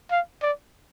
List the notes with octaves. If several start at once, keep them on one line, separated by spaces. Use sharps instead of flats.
F5
D5